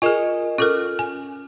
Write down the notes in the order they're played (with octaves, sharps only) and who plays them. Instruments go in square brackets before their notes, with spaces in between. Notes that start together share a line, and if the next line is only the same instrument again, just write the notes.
[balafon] F4 G#4 [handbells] A#4 D#5 G#5
[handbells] C#4 F6 [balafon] F4 A4 A#4
[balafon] G#5